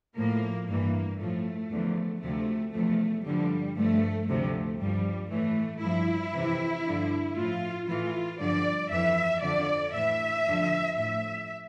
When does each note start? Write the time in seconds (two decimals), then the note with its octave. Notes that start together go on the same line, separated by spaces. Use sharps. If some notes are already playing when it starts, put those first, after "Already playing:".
0.17 A2 F3 A#3
0.68 G2 E3 A#3
1.20 A2 F3 A3
1.71 E2 D3 F3
2.22 D2 C3 F3 A3
2.74 E2 C3 F3 A3
3.25 G2 D3 F3 G3
3.77 G2 F3 A3
4.27 D2 C3 F3 A3
4.79 G2 F3 G3
5.30 A2 E3 A3
5.82 G2 F3 E4
6.34 F2 C3 E3
6.86 G2 D3 F3
7.36 A2 F3 F4
7.88 A2 E3 F4
8.40 G2 D3 F3 D5
8.91 F2 E3 E5
9.42 F2 D3 F3 D5
9.94 A2 E3 E5
10.46 F2 D3 F3
10.96 A2 F3 E5